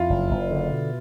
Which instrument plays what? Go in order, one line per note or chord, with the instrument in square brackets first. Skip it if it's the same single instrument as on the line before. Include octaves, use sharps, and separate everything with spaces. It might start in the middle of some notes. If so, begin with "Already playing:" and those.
Already playing: [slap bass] F2 [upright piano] E4 F4
[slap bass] F#1
F#1
D3
B2